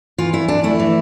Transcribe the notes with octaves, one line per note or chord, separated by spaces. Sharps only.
E3 F4
E2 E4
E2 D4
A3 E4
E3